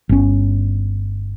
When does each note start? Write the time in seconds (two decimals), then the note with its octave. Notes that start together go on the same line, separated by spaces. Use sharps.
0.09 G1 C#4